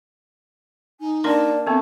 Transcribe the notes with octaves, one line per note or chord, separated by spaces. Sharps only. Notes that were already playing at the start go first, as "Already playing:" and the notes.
D#4 G#5
A#3 D4 D5 A5 C6
A3 B3 C4